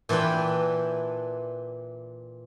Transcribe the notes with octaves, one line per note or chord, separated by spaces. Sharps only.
A#2 E3 D4 B4 G5